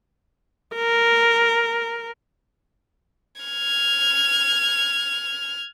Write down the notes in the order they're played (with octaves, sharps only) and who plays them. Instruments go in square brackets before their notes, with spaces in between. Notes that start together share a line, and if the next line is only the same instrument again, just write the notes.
[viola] A#4
[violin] F6 G#6